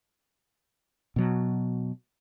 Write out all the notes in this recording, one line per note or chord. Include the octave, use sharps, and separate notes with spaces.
B2 F#3